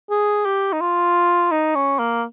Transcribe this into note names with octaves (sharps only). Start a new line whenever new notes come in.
G#4
G4
D#4
F4
D#4
C#4
A#3